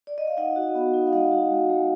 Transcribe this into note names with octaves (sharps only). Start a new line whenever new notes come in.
D5
D#5
F5
D#4 D#5 F#5
F#4
B3
D#4
F5
G#3 D#5 F#5
F#4
G#3
G#3